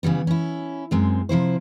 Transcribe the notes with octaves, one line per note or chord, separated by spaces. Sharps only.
C#3 E3 G3 B3
C#4 E4
F#2 G#3 C4
C3 F3 E4 C5